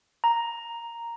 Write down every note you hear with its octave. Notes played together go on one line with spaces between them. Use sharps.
A#5